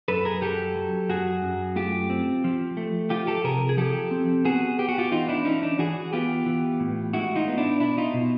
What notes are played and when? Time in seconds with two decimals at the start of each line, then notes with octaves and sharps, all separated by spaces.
0.08 F#2 A4 B4
0.25 G#4 A#4
0.42 F#3 G4 A4
0.76 F#3
1.09 F#2 F#4 G#4
1.43 F#2
1.76 A3 F4 G4
2.10 C4
2.44 F3
2.77 A3
3.10 F3 F4 G4
3.27 G4 A4
3.44 C3 G#4 A#4
3.69 G#4
3.77 F3 G4 A4
4.11 C4
4.45 B3 F#4 G#4
4.79 B3 G4
4.89 F#4
4.98 F4 G4
5.12 E3 D#4 F4
5.29 D4 E4
5.45 E3 C#4 D#4
5.63 D4
5.79 E3 F#4 G#4
6.13 B3 F4 G4
6.46 E3
6.80 A2
7.13 G#3 E4 F#4
7.36 D#4 F4
7.47 B3
7.58 D4 E4
7.80 B2 D4 E4
7.98 D#4 F4
8.14 B2